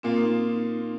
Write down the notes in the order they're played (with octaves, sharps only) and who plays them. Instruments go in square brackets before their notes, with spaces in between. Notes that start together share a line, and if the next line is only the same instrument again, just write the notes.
[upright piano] A#2 A#3 F4 [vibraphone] C4
[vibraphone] D#4
C4